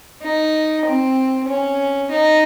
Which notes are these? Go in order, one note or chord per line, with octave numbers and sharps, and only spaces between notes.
D#4
C4
C#4
D#4